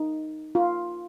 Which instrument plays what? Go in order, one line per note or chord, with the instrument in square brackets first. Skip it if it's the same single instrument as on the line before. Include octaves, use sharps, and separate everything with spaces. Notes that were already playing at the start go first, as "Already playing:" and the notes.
Already playing: [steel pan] D#4
F4